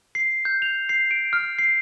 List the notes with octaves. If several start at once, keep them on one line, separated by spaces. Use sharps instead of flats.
C7
G6
F7
C7
D7
F6
C7